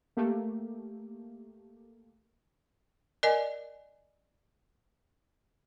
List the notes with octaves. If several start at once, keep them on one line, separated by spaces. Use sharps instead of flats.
A3 A#3 G4
A#4 D5 D#5 G#5